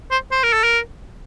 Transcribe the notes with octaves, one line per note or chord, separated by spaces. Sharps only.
C5
C5
A#4
A4
A#4